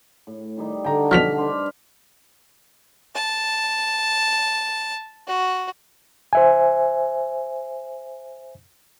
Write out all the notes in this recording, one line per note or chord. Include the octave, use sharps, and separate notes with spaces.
A2
D#3 G3 D#4
D3 G5 A5 A#5 C#6
B2 F3 F#3 F6 B6 F7
D4 B4 C5
A5
F#4
C5 E5 G#5